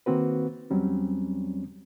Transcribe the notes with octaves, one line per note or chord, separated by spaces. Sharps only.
D#3 A#3 C4 F#4 B4
E2 F#3 G3 C4 C#4